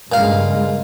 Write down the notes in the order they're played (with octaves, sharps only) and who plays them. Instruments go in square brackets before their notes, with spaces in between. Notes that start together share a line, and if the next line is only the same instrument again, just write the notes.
[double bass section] G2 C#3 G#3 [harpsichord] A#2 F5